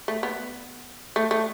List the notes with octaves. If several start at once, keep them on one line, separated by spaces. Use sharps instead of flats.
A3
B3
A3
A3